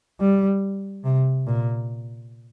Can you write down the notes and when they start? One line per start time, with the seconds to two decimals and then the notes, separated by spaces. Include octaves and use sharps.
0.20 G3
1.05 C3
1.47 A#2